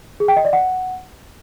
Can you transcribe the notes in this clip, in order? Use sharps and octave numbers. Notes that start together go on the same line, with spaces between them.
G#4
G5
D#5
D5
F#5